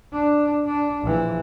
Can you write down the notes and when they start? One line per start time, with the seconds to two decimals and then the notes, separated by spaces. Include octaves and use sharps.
0.13 D4
0.66 D4
1.02 A#1 E3